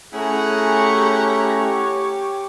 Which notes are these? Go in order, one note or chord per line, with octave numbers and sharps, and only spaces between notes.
A3 C#4 E4 G#4 F#5 A#5
G4 C#5
G4 C#5